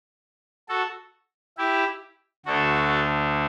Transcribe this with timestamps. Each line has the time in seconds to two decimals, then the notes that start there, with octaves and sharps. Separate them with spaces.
0.69 F#4 A4
1.57 E4 G4
2.46 D2 D3 F#4 A4